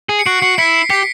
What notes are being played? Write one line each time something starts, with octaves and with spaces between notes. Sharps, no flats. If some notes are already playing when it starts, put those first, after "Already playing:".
G#4
C#7
F#4 C7 D7
F#4 C7
E4 B6 C#7
G4 B6 C#7